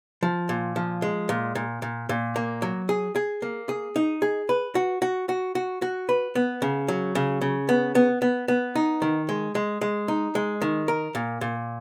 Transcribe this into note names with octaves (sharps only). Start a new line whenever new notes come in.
F3
A#2
F3
G#3
A#2
A#2
A#2
A#2
A#3
F#3
G#4
G#4
A#3
G#4
D#4
G#4
B4
F#4
F#4
F#4
F#4
F#4
B4
B3
C#3
F#3
C#3
C#3
B3
B3
B3
B3
D#4
D#3
G#3
G#3
G#3
D#4
G#3
D#3
A#4
A#2
A#2